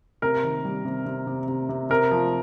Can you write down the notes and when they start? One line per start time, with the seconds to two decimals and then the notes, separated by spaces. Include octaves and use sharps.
0.22 C3 A#4
0.44 D#3
0.65 G3
0.85 C3
1.06 C3
1.27 C3
1.48 C3
1.69 C3
1.90 C3 A#4
2.11 F3